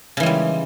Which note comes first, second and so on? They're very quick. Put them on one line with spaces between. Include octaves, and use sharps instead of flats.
C#3 E3 G#3 G3